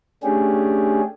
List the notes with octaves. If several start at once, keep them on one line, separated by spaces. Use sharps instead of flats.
A3 C#4 D4 G4 G#4